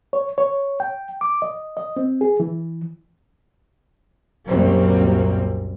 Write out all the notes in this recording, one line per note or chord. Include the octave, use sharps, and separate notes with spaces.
C#5
C#5
G5
D6
D#5
D#5
C4
G#4
E3
C2 F#2 A#2 G3 A#3 C4